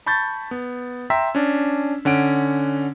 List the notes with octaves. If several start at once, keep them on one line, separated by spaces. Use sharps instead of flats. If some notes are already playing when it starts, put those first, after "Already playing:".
A5 B5 C#6 G6 A6
B3
E5 G5 A#5 C6 E6 B6
C#4 D4
D3 C#4 F#5 D7